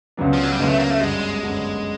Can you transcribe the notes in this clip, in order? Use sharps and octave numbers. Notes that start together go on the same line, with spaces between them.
C#2 C#3 F#3 B3 D4
F3
F#3
G3
C#2 C#3 F#3 G#3 B3 D4
A3
A#3
A3
G1 F#2 D3 G3 G#3
G1 F#2 D3 G3